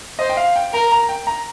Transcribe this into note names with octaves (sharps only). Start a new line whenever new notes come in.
C5 D#5
G5
F5
G5
A#4 A#5
A#5
G5
A#5